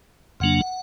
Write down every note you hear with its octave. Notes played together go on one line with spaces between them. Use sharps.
F2 C#3 F#3 A#3 D4 F#5